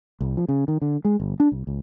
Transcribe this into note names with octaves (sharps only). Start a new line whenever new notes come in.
C2
F3
C#3
D#3
D3
G#3
G1
D4
C2
C#2